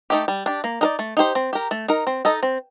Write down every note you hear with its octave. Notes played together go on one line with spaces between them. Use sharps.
A3 D#4 G4
G3
D4 G4
A#3
D#4 A#4 D5
A3
D#4 G4 C5
C4
G4 A#4
A3
D#4 A#4
C4
D#4 A4 D#5
C4